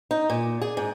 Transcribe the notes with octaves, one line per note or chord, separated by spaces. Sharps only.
D#4
A#2
G#4
G#2